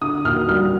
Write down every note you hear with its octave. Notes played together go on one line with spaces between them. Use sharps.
D3 D#6
D#2 F6
G3 F6